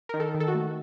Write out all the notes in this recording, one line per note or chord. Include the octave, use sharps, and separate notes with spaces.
D#3 A#4
A4
D#3
A4
F#4
A3